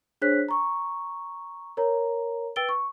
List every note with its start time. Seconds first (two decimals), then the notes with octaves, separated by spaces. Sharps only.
0.22 D4 G#4 C5 C#5 F#6 B6
0.49 A#5 C#6
1.77 A#4 C#5 A#5
2.56 B4 G5 E6 A6 D7 G7
2.69 C#6